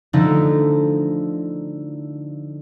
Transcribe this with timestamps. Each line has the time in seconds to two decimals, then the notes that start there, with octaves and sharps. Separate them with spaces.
0.13 D3 F3 A3 D#4 E4